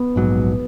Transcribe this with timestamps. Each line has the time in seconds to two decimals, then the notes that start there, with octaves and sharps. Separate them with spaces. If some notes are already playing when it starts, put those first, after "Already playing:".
Already playing: B3
0.16 A#1 G#2 F#3